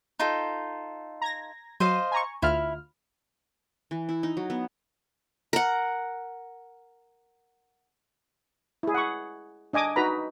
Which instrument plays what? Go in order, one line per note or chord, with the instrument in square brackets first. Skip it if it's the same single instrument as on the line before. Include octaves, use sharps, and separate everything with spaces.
[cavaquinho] D#4 F4 A4
[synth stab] A#5 G#6 A#6
[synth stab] F#3 D#7 [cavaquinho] C5 D#5 F5
[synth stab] G#5 A#5 C#6
[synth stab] D2 F4 F6 [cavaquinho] E4
[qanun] E3
E4
D#4
F#3
B3
A#4 F#5
[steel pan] E4 G#4
F#5 C#6
D4 D#5 G#5 D6 D#6
D#4 F#4 B4 A#5 B5